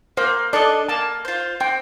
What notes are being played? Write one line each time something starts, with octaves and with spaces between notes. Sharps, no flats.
A#3 C5
D4 A4 D5 D#5
A#3 A5
F4 C5
C4 G5